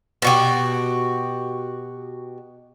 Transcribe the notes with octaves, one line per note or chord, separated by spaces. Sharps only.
B2 F#4 G4